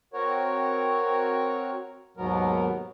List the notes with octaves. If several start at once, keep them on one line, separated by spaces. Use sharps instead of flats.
C4 F#4 A#4 C#5
D#2 G#2 B2 F#3 B3 A#4